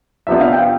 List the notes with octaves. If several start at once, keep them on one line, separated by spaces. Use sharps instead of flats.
F2 C3 F3 B3 D4 E5
F5
G5